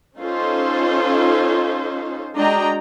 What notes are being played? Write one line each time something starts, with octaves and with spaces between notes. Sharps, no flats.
C#4 D#4 F4 A4 C5
G#3 D4 F#4 D#5 G5 A#5